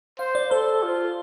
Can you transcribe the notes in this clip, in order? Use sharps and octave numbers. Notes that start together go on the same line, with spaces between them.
C5 F5
D5
A4 C5
F4